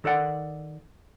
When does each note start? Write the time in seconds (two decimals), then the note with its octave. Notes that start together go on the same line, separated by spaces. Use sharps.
0.04 D#3 A4 D5 F#5